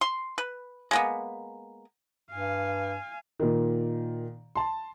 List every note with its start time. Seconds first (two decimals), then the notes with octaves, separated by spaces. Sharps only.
0.01 C6
0.38 B4
0.91 G#3 A#3 B3
2.31 G2 F5 G#5
3.40 A#2 D#3
4.55 A5 C6